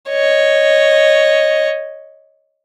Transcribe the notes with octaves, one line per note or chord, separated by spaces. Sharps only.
C#5 D#5